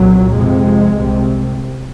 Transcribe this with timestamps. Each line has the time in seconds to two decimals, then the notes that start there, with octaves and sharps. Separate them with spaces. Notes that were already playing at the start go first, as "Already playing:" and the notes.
Already playing: C2 A#2 F#3
0.34 F2 C3 G#3
0.94 C2 C3